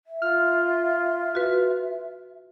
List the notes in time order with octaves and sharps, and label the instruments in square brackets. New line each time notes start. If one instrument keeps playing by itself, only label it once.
[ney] E5
[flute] F4 [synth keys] F6
[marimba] F#4 B4